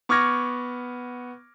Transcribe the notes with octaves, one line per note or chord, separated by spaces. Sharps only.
B3 C#6 D6 F6 G#6 A#6